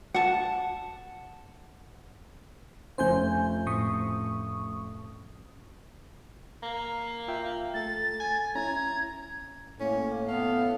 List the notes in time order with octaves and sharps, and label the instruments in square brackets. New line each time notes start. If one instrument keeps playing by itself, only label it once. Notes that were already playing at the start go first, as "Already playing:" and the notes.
[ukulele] F#5 A5
[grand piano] F1 C#4 [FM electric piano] C5 G#5 G6
[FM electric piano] A2 C#6 D#6
[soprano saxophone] A#3
[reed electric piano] F4 E5 G5
[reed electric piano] A3 A4 [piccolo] A6
[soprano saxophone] G#5
[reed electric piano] C#4 E4 [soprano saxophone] A#5 [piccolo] G#6
[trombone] A2 [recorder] A#3 [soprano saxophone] C#4
[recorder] B3 [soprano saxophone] A4 [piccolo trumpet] F5